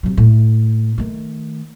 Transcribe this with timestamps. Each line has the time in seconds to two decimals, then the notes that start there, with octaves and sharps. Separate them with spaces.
0.03 C3 F#3
0.17 A2 A3
0.98 D#3 A3